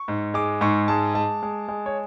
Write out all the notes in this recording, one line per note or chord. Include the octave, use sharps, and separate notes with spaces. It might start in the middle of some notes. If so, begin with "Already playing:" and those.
Already playing: C#6
G#2
G#3 D6
G#2 C#6
G#3 A5
G#3 A5
G#3
G#3
C#5